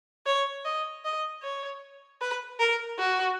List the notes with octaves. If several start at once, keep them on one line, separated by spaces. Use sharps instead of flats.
C#5
D#5
D#5
C#5
B4
A#4
F#4